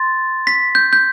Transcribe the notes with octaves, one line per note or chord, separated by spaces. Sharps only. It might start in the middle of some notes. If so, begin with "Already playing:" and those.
Already playing: C6 A6
B6
G6
G6